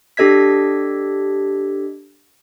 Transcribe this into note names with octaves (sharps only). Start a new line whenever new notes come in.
D4 G4 A4 D#5 G#6 B6